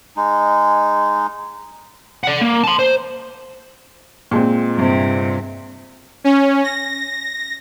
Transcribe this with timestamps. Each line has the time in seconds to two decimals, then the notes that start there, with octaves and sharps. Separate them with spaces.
0.16 G#3 D#4
2.24 D5 F#5
2.41 A#3
2.64 A5 C6
2.79 C5
4.31 A#2 G#3 C4
4.74 G2 C3
6.24 C#4
6.64 A#6